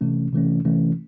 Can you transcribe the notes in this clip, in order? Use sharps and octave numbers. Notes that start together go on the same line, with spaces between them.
C3 E3 A3 C#4
C3 E3 A3 C#4
C3 E3 A3 C#4